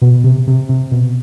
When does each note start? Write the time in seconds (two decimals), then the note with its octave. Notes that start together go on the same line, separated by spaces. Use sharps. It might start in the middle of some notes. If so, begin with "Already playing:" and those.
0.02 B2
0.24 C3
0.47 C3
0.69 C3
0.92 B2